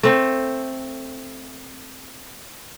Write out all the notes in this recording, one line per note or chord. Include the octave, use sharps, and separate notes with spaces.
A3 C4